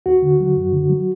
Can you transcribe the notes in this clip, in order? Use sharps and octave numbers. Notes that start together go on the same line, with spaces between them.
D#2 F#4
D3
F#3
F#2
D3
F#3